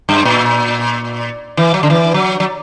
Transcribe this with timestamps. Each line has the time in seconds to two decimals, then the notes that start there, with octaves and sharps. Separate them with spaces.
0.09 G2
0.25 A#2
1.57 E3
1.74 F#3
1.83 D3
1.90 E3
2.14 F#3
2.40 F#3